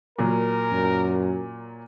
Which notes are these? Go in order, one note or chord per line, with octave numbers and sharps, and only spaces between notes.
A#2 F#3 A#4
F#2